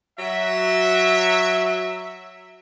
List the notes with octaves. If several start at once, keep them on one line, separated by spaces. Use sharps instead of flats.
F#3 E5